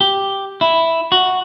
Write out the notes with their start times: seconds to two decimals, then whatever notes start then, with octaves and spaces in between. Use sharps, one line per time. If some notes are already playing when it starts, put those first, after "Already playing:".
0.01 G4
0.61 E4
1.12 F#4